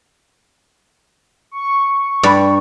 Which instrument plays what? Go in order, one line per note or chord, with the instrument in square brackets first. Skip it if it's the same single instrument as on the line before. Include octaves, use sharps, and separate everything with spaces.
[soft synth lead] C#6
[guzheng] G2 D5